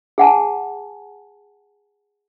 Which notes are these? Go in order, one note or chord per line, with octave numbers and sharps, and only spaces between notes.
G#4 F#5 G#5 A5